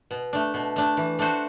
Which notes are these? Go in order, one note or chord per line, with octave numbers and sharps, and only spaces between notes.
B2
A3 D4
B2
A3 D4
E3
A3 D4 F#4 C5